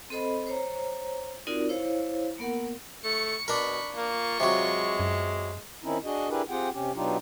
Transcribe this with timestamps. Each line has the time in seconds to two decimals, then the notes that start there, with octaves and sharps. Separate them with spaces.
0.10 C4 A4 C5 D#5 B5
0.47 C5 C#5 A#5
1.47 C4 D#4 F4 F#4 A#4 D5
1.69 E4 C5 C#5 F5
2.38 A#3 B3 A#4 F#5
3.04 A3 C#6 C#7
3.48 B2 D4 A#4 B5 C#6
3.96 A#3 F4 C#6
4.40 C3 F#3 G#3
5.00 F#2
5.83 D#3 C4 C#4 D#4 E4
6.04 D4 F#4 G#4 D#5
6.29 D4 E4 G4 G#4 A#4 B4
6.50 C4 F4 G4 G#4 F#5 G5
6.72 C3 C#4 G4
6.95 B2 F#3 D4 D#4 F4 G4